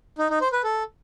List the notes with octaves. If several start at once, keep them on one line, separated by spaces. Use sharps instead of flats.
D#4
D#4
C5
B4
A4